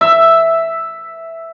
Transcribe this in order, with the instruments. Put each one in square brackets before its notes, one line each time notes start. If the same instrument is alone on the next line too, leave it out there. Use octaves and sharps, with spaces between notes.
[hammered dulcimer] E5